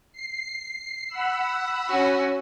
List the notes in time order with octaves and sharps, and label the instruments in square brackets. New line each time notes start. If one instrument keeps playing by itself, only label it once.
[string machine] C7
F#5 B5 E6
[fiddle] C#4 F#4